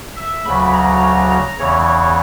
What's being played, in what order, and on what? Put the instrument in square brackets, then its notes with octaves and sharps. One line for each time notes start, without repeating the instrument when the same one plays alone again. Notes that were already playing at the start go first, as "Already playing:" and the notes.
[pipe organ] E5
D2 C#3 F#3 B5
A#5
A#5
E2 C#3 E3 C#5